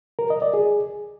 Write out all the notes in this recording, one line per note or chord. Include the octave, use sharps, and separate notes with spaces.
A#4
D#5
D5
G#4